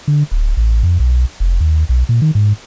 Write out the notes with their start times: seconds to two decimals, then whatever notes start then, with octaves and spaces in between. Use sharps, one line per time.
0.08 D3
0.32 D1
0.57 A1
0.83 F2
1.00 B1
1.40 F1
1.60 D#2
1.89 B1
2.09 A#2
2.22 D#3
2.35 G#2